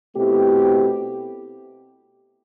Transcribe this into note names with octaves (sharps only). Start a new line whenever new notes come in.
B2 A3 C4 E4 G4